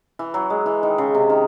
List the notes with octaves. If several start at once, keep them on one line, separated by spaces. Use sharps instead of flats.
E3
F#3
G#3
E3
D#3
C#3
C3
D#3